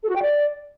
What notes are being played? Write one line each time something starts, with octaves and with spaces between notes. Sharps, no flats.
A4
F#4
G5
D5